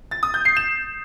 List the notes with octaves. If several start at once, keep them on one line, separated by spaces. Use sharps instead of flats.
A6
D#6
G6
C7
E7